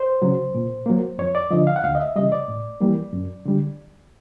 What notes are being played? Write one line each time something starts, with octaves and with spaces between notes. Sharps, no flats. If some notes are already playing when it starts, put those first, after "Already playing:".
Already playing: C5
C#3 F#3
A#2
F#3 A#3
F2 C#5
D5
D3 F3 D#5
F5
F#5
D2 F5
D#5
E5
C#3 E3 G3 D#5
D5
A2
E3 G3 A#3
F#2
D3 G3